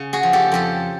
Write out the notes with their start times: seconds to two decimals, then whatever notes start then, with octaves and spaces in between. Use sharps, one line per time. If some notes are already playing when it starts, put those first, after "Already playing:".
Already playing: C#3
0.13 F#4 G#4
0.23 F3
0.33 G4 A4
0.52 F2 G4 A4